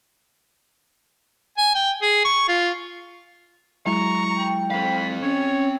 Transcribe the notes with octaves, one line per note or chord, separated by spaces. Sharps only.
G#5
G5
G#4
C#6
F4
F#3 G#3 E4 A#5 C#6
G5
C4 F5 B5
C#4 C#5